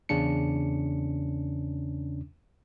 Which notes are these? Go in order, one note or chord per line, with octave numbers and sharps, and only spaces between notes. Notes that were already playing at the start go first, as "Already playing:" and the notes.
E2 C#3 C#4 D4 C#7